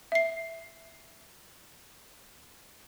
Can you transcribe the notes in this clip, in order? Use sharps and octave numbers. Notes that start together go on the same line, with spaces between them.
E5 C7